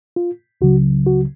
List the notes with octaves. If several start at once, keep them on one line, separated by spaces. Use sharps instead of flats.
F4
C#2 C#3 F#3 F#4
F#4